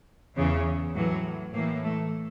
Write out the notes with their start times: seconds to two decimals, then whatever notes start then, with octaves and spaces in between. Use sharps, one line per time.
0.36 E2 C#3 E3
0.95 A2 E3 F#3
1.54 A2 E3 A#3
1.84 A3